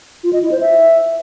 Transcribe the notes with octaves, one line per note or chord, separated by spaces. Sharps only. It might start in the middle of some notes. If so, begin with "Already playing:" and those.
F4
D#5
E4
C5
E5